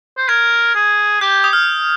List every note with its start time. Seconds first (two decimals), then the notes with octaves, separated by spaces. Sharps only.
0.17 C5
0.28 A#4 G#6
0.75 G#4
1.21 G4 G6
1.44 D#6
1.53 F6